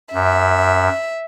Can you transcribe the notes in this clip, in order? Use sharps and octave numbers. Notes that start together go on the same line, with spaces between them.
F#2 E5